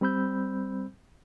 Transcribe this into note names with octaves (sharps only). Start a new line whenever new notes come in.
G3 C4 C5 B5 E6 G6